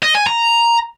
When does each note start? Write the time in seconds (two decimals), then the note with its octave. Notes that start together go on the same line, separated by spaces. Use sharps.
0.03 D#5
0.15 G#5
0.27 A#5